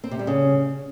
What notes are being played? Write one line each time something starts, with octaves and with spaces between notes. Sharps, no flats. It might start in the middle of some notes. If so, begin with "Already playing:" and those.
C4
C3
G3
C#3